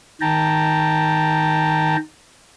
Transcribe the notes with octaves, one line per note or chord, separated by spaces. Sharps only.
D#3 G5 A5 A#5